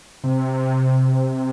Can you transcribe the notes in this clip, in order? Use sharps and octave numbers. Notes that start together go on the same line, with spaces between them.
C3